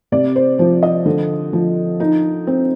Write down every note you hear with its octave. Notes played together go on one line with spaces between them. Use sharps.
C3 D5
C5
F3 C5
D#5
D3
F3
D#4
C4